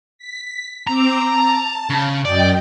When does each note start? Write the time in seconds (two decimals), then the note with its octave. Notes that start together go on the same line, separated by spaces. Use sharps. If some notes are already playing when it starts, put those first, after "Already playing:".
0.18 B6
0.87 C4 A#5 D6 E6
1.29 A5
1.90 C#3
2.25 F#2 D5 D#5 G5